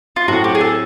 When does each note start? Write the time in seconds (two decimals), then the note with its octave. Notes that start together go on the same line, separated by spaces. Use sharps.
0.16 F4
0.28 A2 F#3 A3 C4 F#4
0.44 G4
0.55 G#4
0.61 A4